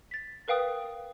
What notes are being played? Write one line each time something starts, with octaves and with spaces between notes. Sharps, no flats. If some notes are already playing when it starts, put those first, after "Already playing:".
A6 B6
A#4 B4 F5 G5 D#6